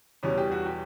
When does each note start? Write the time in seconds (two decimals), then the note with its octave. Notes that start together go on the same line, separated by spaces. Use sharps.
0.23 E2 B2 G3 C#4
0.38 G4
0.52 F#4
0.66 G4